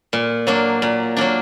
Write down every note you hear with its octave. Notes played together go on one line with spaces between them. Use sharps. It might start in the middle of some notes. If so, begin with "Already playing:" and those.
A#2
F#3 A#3 D4
A#2
F#3 A#3 D4